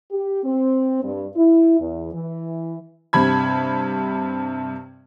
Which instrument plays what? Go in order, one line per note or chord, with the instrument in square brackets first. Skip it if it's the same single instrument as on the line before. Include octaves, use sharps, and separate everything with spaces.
[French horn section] G4
C4
G2
E4
E2
E3
[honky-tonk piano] G2 C3 B5 G#6